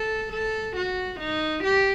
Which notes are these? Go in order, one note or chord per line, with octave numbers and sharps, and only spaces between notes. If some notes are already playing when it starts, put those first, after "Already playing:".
Already playing: A4
A4
F#4
D#4
G4